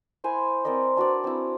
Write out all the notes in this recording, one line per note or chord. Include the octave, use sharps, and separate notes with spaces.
E4 C5 G#5 B5
C4 A#4 D5 D#5
D4 F#4 B4 D5
C4 E4